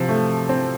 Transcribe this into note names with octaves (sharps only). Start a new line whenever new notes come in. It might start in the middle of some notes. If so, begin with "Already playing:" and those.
Already playing: C3 F3
A3
C4